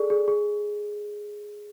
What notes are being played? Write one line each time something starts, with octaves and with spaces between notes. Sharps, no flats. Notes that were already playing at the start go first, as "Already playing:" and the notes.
Already playing: G#4 A4 D5
G#4
G#4